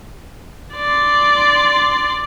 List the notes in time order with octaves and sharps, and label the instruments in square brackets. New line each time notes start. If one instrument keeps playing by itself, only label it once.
[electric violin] D5 C6